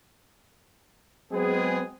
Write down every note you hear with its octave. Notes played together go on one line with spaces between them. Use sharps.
F#3 G#3 B3 C4 G#4